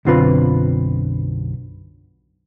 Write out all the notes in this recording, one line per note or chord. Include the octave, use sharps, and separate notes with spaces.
B1 F#2 D3 C4 F4 B4